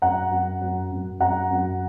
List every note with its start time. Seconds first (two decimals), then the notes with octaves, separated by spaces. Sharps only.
0.02 F#2 F#5 A#5
0.31 F#2
0.61 F#2
0.91 F#2
1.20 F#2 F#5 A#5
1.51 F#2